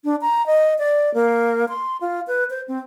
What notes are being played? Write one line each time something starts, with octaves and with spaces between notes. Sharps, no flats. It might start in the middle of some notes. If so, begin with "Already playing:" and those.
D4
A#5
D#5
D5
A#3
C6
F4
B4
C5
C4